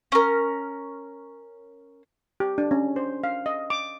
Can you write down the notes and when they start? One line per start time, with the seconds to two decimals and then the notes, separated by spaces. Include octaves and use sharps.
0.12 C#4 A#4
2.40 G4
2.58 D4
2.71 C#4
2.96 C5
3.24 F5
3.46 D#5
3.70 D6